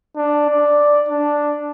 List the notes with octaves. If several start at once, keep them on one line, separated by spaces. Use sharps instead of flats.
D4
D5
D4